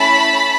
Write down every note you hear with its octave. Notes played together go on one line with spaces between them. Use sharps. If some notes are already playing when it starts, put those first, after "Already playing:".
Already playing: A3 C#4 E4 A5 B5